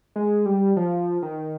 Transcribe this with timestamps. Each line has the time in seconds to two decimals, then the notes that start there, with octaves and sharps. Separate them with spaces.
0.16 G#3
0.46 G3
0.77 F3
1.22 D#3